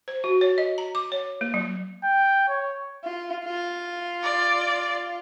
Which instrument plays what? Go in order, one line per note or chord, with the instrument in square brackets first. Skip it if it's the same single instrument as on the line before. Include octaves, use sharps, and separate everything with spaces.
[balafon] C5
F#4
C#5
D#5
A#5
D6
C#5
A#3
F#3
[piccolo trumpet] G5
C#5
[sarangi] F4
F4
[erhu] D5